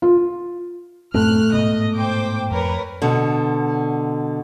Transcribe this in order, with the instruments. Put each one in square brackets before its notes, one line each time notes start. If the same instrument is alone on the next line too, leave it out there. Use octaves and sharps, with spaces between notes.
[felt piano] F4
[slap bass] F#2 C4 [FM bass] A2 [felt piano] A3 [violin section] F6 F#6
[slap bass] G#2 B2 [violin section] D#5
[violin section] C5 G5 D6
[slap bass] F2 [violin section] A#4 B4 C#5
[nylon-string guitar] B2 D3